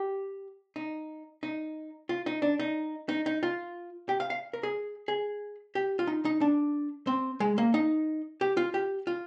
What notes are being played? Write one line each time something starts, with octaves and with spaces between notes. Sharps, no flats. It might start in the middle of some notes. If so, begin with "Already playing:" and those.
Already playing: G4
D#4
D#4
F4
D#4
D4
D#4
D#4
D#4
F4
G4
F5
F5
A#4
G#4
G#4
G4
F4
D#4
D#4
D4
C4
G#3
A#3
D#4
G4
F4
G4
F4